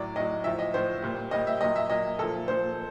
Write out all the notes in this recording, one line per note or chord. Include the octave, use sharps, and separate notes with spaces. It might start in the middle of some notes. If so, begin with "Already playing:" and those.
Already playing: A2 F#3 D5
A2 F#3 D#5
A2 F3 E5
D#5
A2 F3 C5
A#2 G3
A#2 G3 D#5
E5
A#2 F#3 D#5
E5
A#2 F#3 D#5
A#2 F3 A4
A#2 F3 C5